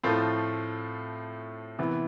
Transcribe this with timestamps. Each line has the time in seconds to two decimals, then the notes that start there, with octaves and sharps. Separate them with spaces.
0.03 A2 F3 A3 C4 F4
1.79 C3 E3 B3